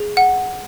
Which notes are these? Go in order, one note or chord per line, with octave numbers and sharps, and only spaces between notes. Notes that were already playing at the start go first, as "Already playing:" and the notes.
Already playing: G#4
F#5